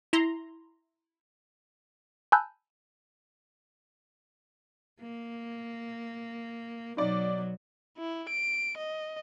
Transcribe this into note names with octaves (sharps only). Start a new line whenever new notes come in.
E4 A#5 C6
G#5 A5 B5 E6 F#6 G6
A#3
B2 F#3 D#4 D5
E4
D7
D#5